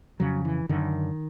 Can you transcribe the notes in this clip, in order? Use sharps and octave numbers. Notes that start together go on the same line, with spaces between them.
F2 C#3 F#3
E3
F#2 D3 D#3